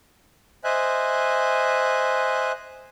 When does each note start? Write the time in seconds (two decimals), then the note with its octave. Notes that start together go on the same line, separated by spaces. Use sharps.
0.64 C5 D#5 E5 G#5 F#6